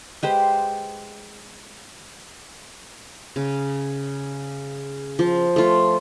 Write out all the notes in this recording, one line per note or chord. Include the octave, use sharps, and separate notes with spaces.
G#3 G4 B4 C5
C#3
F3
A3 F4